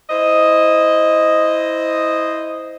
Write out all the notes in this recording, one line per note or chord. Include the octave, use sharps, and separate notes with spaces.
E4 C5 D#5